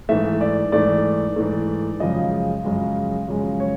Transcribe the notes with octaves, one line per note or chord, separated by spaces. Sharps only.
G#2 E3 A3 E5
D5
G#2 E3 A3 D5
G#2 E3 A3
F#2 C#3 F3 G#3 D#5
F#2 C#3 F3 G#3
F#2 C#3 F3 G#3
C#5